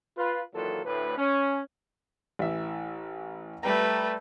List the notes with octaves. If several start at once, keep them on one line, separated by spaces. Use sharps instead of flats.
F4 B4
A#2 D#3 E3 F#3 F4 A4
D2 A2 B4
C#4
A1 E3 E5
G3 A3 B4 G5 A#5